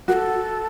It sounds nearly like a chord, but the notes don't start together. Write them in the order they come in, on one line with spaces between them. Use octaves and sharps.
F#4 A#4 A4